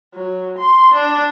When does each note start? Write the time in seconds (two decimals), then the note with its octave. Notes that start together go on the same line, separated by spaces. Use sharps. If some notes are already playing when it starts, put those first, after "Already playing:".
0.15 F#3
0.58 C6
0.94 D4